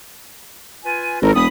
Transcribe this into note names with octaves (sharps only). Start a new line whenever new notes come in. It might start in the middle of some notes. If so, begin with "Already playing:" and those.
F4 B4 G#5
G#1 A4 A#4
E1 B5 D#6